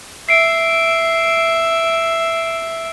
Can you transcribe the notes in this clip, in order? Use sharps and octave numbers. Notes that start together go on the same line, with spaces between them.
E5 C7 D7